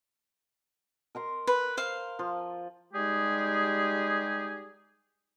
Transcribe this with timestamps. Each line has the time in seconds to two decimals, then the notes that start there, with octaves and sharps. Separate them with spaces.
1.15 A#4 A#5 C6
1.47 B4
1.77 C5 F5
2.19 F3
2.93 G3 G#3 D#4 G4 G#4